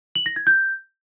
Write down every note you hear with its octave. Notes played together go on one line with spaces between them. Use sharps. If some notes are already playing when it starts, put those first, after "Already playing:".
F#7
A#6
G#6
G6